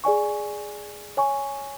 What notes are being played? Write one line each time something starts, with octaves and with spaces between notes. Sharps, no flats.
G#4 D5 G#5 C#6
C#5 G#5 C#6